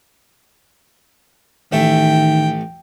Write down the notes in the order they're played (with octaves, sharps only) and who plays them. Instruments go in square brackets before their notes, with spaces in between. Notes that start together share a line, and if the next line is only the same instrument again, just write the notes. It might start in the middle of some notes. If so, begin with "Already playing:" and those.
[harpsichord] A1 A3 E5 [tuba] D#3 [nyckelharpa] G5